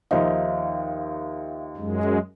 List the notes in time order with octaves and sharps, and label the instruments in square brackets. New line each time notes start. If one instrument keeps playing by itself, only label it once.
[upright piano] D#2 F3 D#4 [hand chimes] E5 F5
[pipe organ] F#2 G#3